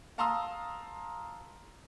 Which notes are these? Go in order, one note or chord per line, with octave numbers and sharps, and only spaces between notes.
F5 A5 A#5 C6 D#6 E6